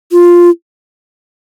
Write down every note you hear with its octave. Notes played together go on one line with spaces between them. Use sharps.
F4